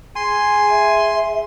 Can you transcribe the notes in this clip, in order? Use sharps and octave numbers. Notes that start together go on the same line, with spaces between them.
G#4 G#5 C6
E5